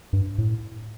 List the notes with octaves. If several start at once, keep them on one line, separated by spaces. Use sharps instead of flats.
G2
A2